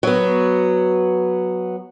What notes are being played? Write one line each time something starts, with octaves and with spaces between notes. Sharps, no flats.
F#3 B3